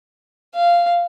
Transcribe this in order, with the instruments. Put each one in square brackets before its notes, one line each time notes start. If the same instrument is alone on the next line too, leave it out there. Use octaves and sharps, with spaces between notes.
[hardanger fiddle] F5